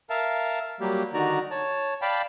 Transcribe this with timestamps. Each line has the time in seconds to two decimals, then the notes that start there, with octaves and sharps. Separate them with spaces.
0.10 A#4 E5 F5 A5
0.80 F#3 G3 A#3 G4
1.14 D3 D#3 D#4 F#4 D5 A#5
1.51 C#5 A5
2.02 D5 F5 G5 A5 B5